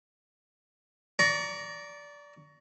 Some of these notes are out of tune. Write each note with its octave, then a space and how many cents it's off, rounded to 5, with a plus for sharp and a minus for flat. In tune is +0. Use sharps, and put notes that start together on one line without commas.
D5 -15 A#5 +0 C#6 +25